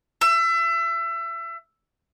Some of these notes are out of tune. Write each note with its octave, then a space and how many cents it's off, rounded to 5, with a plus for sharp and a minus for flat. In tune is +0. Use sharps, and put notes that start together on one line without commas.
E5 +30